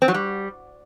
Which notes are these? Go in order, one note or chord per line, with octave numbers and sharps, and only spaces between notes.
C4
F#3
G3